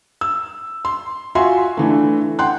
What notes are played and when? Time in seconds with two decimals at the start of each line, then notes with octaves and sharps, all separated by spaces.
0.21 E6
0.85 C6
1.35 F4 F#4 E5 G#5 C6
1.77 D3 E3 A3
2.39 F#5 G5 C6 F#6